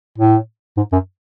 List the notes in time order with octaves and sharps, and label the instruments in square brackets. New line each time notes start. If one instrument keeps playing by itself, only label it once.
[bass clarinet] A2
G#2
F#2